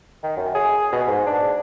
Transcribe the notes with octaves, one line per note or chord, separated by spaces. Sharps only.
D#3
F#2
G#4
B2
G#2
D4